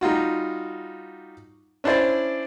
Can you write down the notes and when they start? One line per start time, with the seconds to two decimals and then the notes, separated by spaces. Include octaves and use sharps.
0.01 G3 D#4 F4 F#4
1.84 C#4 D4 E4 C5 D5